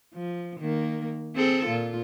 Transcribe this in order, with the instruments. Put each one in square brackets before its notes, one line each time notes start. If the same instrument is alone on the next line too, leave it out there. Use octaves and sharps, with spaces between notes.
[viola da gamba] F3
D#3 A#3
C4 G#4 A4
A#2 F4